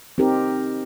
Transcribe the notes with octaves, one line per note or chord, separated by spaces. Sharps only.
C4 D#4 G4 A#4